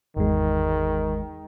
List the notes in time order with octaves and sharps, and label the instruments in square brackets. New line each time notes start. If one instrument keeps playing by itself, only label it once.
[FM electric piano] G#1 E2 G#3 [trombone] D#3